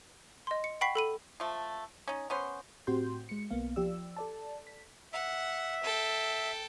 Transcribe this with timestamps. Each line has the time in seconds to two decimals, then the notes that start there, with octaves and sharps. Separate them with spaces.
0.47 D#5 C6
0.64 C#7
0.81 F#5 G5 B5 C#6 B6 C7
0.95 A4 B5 D#7
1.40 F3 A3
2.08 C#4 D#4
2.30 B3 C#4 C5
2.87 A2 C4 F#4 G4 C6 G6
3.29 G#3 C#7
3.51 B1 A#3 B3 F5
3.76 F3 G4 D5 E6
4.17 A4 D5 A5
4.67 B6
5.13 E5 F#5
5.83 A4 G5